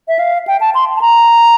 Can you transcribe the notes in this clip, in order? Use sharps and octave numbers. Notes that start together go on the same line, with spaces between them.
E5
F5
G5
A5
C6
A5
A#5